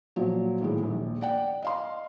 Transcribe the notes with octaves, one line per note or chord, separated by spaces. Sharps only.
A#2 F3 F#3
A2 D#3 G#3
A#1 D#2
D5 F#5 G5
D#5 F5 C6